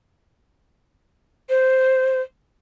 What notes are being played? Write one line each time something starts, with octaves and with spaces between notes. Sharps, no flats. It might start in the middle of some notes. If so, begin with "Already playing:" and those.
C5